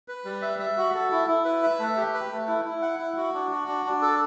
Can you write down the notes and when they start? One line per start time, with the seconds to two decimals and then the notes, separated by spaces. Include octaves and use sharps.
0.08 B4
0.25 G3
0.42 E5
0.59 E5
0.77 F#4
0.95 A4
1.12 E4
1.28 E4
1.45 B4
1.63 E5
1.79 A3
1.97 G4
2.14 B4
2.31 A3
2.48 E4
2.65 E4
2.82 F#5
2.99 E4
3.17 F#4
3.34 D4
3.51 F#4
3.68 D4
3.86 D4
4.02 A4